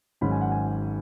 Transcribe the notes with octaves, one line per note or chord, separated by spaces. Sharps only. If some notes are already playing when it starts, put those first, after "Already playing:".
G#1 G#2 F#3 C#4 B5
G#5
F#5
G#5